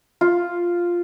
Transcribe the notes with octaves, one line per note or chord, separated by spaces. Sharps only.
F4